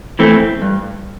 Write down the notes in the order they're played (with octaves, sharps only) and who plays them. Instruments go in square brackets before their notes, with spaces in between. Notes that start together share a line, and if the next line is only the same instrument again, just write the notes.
[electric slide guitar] E3 A3 C4
G2